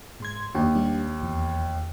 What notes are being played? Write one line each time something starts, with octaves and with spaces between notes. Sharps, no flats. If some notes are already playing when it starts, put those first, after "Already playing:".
G#2 C6 G#6
D#2 D4
G3 D4
E2